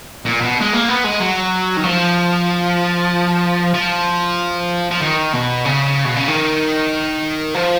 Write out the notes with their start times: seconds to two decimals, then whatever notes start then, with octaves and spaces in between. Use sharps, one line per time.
0.25 A#2
0.41 B2
0.61 G#3
0.73 A#3
0.89 B3
1.04 G#3
1.20 F#3
1.77 D#3
1.84 F3
3.74 F3
4.91 F3
5.01 D#3
5.33 B2
5.65 C#3
6.05 B2
6.16 C#3
6.28 D#3
7.54 F3